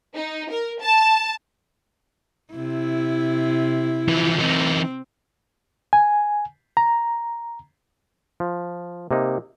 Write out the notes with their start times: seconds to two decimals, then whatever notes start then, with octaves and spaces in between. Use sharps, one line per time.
0.14 D#4
0.51 A#4
0.81 A5
2.53 C3 E4
4.08 E3 F3
4.38 E3 C4 D#4
5.93 G#5
6.77 A#5
8.40 F3
9.11 C3 A#3 D#4